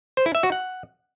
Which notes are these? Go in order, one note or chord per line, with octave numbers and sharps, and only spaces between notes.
C5
E4
E5
F#4
F#5